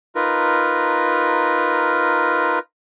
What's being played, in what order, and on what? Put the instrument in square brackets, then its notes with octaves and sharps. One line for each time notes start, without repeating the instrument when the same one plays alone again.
[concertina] D#4 F4 A#4 B4